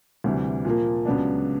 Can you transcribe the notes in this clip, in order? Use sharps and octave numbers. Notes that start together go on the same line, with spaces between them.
D2 C3 E3 G3
A#2 F3 A#3
C#2 C#3 F#3 B3 D4